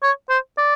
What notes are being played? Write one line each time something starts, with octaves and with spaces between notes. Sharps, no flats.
C#5
C5
D5